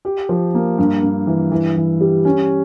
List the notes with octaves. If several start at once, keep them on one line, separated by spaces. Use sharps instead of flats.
G4
F3
A#3
G2
G2
E3
E3
E3
G3
C#4